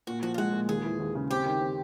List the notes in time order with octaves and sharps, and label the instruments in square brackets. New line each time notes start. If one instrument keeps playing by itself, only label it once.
[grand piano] A#2 [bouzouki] F#4
[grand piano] F3 [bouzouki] F#4
[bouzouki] F4
[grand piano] G#3 [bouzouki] F#4
[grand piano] A#2
[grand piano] D#2 [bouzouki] G#4
[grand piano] E3
D#2
C#3
[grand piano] C4 [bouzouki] G4
[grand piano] D#3
C4